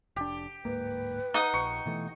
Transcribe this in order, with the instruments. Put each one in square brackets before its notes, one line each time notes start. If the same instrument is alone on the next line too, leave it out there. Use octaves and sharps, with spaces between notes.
[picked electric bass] F1 D4 [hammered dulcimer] G4
[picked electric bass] D1 G#2 A#3 [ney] B4
[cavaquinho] D#4 F#5 D#6
[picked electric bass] A#1 [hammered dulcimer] C#6
[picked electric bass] B2 E3 A3